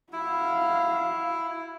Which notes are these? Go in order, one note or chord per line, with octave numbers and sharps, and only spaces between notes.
E4 F#4 F5